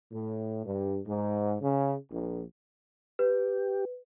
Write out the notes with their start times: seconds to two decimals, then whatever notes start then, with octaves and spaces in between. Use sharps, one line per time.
0.12 A2
0.65 G2
1.07 G#2
1.61 C#3
2.11 A#1
3.19 G4 B4